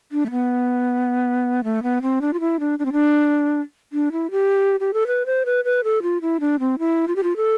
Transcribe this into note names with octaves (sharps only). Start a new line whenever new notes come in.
D4
A3
B3
A3
B3
C4
D4
F4
E4
D4
D4
C4
D4
D4
E4
G4
G4
A4
B4
C5
B4
B4
A4
F4
E4
D4
C4
E4
F4
G4
F4
A4